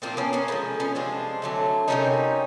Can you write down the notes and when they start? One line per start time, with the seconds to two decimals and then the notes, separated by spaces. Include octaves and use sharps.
0.02 A#2 F3 A#3 C4 D4
0.17 B3 C#4
0.33 B3 C#4
0.48 D3 F3 G#3 B3
0.80 B3 C#4
0.95 C3 F3 G#3 C4 D4
1.42 D3 F#3 A3
1.88 C3 D#3 G3 A#3 C#4 D#4